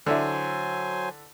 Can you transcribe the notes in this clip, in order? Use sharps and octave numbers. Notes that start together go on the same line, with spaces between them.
D3 F#3 E4 C5 G#5